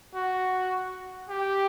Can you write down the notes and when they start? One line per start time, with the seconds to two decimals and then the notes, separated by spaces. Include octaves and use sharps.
0.15 F#4
1.29 G4